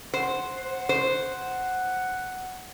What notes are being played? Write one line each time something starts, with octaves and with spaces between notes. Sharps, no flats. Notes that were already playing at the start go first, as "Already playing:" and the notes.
C5 F#5
C5